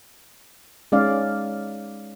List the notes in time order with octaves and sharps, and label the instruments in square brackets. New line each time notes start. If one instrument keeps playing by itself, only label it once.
[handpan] G#3 C#4 D#4 D5 F5